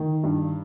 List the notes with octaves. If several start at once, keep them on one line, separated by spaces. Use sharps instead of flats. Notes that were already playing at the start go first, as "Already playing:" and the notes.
Already playing: D#3
G2